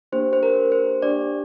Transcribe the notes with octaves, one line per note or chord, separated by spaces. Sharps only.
A#3 D4 G4 C5
C5
A#4
C5
D4 G4 D5